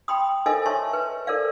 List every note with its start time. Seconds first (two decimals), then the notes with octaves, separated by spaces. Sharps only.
0.08 G5 B5 C6 D#6
0.46 A4 A#4 C5 D#5 F5 G#5
0.66 C#5 E5 A5 C6 C#6
0.93 B4
1.27 A4 A#4 C5 D5 F5